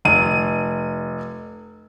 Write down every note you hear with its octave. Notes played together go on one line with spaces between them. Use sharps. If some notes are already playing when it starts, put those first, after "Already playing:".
F1 D#7